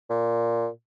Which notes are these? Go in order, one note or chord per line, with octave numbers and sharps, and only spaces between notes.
A#2